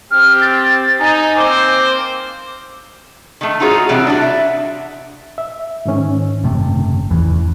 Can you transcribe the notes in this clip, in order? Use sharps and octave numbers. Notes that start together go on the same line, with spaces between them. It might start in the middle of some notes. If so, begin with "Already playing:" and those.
C4 G4 F6
A6
D#4 G#5
A#3 C4 C5 D6
D#3 A3
D#4 F4 F#4 G#4 C#5
C3 E3 G3
D4 F#4
E5
E5
G#2 D#3 C#4
F#1 C3 A3
E2 E3